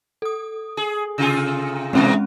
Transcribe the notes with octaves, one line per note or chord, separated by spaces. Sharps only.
A4 D#6
G#4
C3 F4 G#4
G#2 B2 E3 G#3 C4 C#4